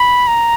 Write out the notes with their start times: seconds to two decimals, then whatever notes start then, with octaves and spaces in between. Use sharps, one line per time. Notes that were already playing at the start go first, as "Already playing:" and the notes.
Already playing: B5
0.27 A#5